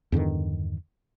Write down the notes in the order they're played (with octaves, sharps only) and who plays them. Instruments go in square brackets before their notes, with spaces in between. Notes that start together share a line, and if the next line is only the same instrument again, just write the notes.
[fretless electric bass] E2 G2 D3 D#3